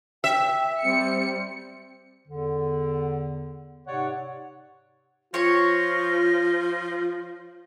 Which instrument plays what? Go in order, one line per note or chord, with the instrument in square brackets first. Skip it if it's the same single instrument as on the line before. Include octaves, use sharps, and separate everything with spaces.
[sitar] E5 [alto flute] G5
[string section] G3 C#7 [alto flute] C4
[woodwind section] E2 D3
G#2 C3 C#5 D5 F#5
[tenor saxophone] F3 [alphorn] F4 [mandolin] C#5 C#6 [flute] A#6